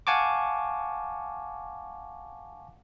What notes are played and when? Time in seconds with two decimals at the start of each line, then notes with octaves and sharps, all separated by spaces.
0.07 F5 F#5 G#5 A5 C#6 D6